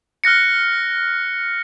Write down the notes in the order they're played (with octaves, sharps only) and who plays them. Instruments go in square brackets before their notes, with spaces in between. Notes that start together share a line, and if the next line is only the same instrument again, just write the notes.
[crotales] F6 F#6 A#6 C#7